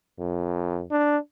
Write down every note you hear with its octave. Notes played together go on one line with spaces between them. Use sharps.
F2
D4